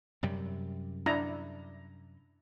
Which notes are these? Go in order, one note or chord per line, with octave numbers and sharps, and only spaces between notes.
F#2 C3 G3
D4 E4 A#5